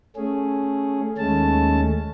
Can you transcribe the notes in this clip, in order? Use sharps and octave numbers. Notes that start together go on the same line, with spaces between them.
A3 C#4 G#4
D#2 G#3 A3 C#4 A5